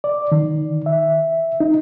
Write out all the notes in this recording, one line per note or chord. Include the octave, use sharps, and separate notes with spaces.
D5
D#3
E5
D#4